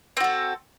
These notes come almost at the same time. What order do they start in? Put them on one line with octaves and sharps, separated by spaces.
C4 F#4 A4